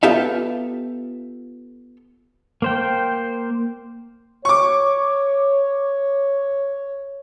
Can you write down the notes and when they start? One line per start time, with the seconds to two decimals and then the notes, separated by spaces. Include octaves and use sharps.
0.03 B3 F4 G4 A4 E5 F5
2.62 A#3 C5 G5
4.45 C#5 C#6 D6